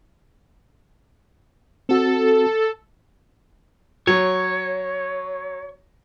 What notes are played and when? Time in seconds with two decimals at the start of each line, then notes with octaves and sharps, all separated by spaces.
1.89 C4 F#4 A4
4.07 F#3 C#5